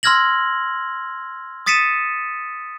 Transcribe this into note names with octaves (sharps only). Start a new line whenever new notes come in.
C6 E6 F6 G#6 A#6 F#7
D#6 A6 B6 C#7 D#7 E7